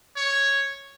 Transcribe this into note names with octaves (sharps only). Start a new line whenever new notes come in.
C#5